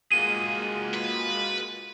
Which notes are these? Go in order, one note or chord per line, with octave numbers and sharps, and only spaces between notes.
G#3 A#3 F4 F#4 G#4 D#7
B4